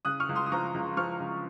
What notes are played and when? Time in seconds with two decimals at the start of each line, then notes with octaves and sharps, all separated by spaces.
0.05 C#3 D#6 F#6
0.20 C#6 F6
0.29 C#2
0.35 C6 D#6
0.46 D#6
0.52 F3 A#5 C#6
0.74 C#2
0.97 F3 C#6 F6
1.20 C#2